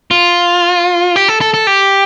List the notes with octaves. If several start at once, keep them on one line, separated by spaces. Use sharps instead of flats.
F4
G4
A4
A4
A4
G4